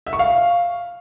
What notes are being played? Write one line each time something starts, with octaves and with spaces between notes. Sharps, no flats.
E5
C#6
F5